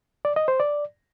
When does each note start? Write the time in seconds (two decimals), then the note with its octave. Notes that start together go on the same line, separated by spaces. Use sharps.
0.25 D5
0.36 D#5
0.48 C5
0.60 D5